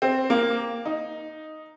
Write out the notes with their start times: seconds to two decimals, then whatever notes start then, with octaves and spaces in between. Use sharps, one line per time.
0.02 C4
0.30 A#3
0.85 D#4